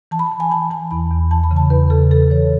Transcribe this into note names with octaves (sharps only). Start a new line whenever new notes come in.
E3 A5
B5
A5
E3
G#5
E3 A5
E3 A5
E2 B5
E2
E3 A5
B5
C#3
A5
E2 B4
C#3 A4
E3 A4
E3 C#5